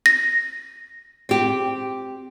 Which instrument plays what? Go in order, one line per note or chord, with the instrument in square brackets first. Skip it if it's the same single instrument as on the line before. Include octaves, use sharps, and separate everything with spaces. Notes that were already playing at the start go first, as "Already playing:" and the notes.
[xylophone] A#6
[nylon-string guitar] C4 G4